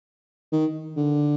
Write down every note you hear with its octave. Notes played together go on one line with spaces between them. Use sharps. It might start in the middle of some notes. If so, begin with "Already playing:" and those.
D#3
D3